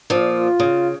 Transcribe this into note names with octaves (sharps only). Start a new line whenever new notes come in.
A#2 F3
F4
C#3